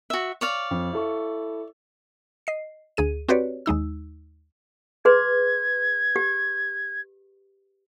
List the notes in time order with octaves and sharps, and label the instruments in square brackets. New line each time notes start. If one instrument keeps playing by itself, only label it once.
[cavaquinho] F#4 E5
C#5 D5 F5
[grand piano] F2
E4 A4 C#6
[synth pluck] D#5 C7
D2 G#4 D#7
C4 F#4 G4 B4 C#5 D5
D#2 G#3 D#4 E6
[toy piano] G#4 B4 C6 [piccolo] G#6
[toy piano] G4